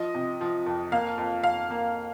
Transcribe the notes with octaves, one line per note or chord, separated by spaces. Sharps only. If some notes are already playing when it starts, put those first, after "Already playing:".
Already playing: F3 D#5
C3
F3
F2
A#3 F5
F2
F2 F5
A#3